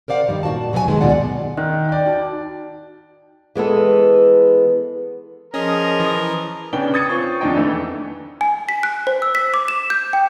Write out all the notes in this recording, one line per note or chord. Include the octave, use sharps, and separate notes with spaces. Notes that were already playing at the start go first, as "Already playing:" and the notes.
A#4 C5 D5 F5 F#5
G2 D#3 G3
A#2 F#4 A5
B2 F#3 B4 C5 G#5
F#2 D#3 G#3 A5
D#2 B2 F4 D5 F#5
D#3 F#6
D5 G5
D#4 F#4 A5
E3 G#3 B3 A4
F3 C#4 G#4 A#4 D#5 D#6
E3
C#3 B3 C#4 D4 G5 G7
D#6 G#6 A6 C#7 D#7
C4 F4 C#5 C#6
E2 D3 F3 D4 D#4 G5
F2 D3 E3 A3
G#5
B6
F#6
C5
E6
B6
D6
E7
G6
G5